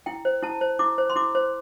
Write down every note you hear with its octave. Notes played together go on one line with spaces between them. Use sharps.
E4 G5
C5
E4 A5
C5
E4 D6
C5
C6
E4 D6
C5